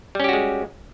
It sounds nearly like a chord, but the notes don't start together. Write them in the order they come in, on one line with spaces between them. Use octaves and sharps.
G3 C#4 G4 F#4 G#3